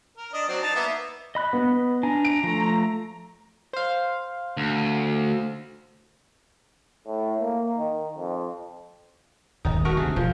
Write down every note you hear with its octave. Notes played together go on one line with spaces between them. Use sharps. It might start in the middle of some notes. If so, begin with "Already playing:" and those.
A#4
D4 D#5
F#3 C4 D4
D#4 A5
A#3 B3 E5
D#5 B5 F#6
B3
D4 G#5 A#5
D7
F3 A3
C5 F5
D2
A2
A#3
D#3
F2
D#1 G#1 D#4
A3 F#4 A#4
D2 C3 G#4
E1 F3